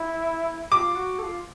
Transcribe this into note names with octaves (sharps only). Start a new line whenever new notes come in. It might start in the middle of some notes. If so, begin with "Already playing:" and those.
Already playing: E4
F4 D6
F#4
A4
F4